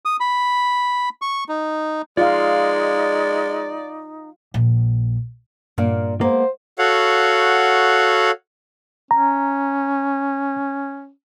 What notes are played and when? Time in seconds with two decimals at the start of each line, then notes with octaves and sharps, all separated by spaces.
0.05 D#6
0.20 B5
1.22 C#6
1.49 D#4
2.18 G#3 D#4 F4 D5 F5
4.54 A#1
5.78 G2 A#2 A#3
6.21 G#3 A#3 B3 C5
6.79 F#4 A4 C#5 F5 F#5
9.11 C#4 A#5